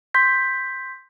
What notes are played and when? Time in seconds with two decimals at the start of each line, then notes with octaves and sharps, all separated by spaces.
0.14 C6 G6 B6